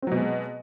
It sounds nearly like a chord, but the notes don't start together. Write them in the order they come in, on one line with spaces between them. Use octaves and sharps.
C4 F#3 B2 G#3